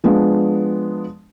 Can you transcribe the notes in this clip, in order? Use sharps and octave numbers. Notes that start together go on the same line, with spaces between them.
F3 G#3 B3 D4